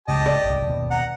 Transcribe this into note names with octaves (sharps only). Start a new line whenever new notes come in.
D1 C#2 C#3 G4 D#5 A5
D5
G1 C2
D#2 B2
F#5 A#5